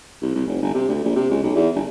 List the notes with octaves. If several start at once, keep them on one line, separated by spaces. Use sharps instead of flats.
C2
C2
F1
G1
C3
D2
A#1
C3
C#2
B1
E2
G1